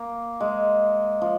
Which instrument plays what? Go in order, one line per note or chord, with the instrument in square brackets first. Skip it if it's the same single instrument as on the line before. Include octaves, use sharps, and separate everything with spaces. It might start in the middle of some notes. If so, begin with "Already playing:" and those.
Already playing: [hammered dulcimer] A#3
G#3
F3